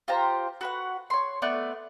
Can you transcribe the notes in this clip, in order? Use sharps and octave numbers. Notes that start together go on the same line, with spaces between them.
F4 G4 C5 A#5
F#4 B4 F#5
C#5 C6
A3 B3 D5 F#6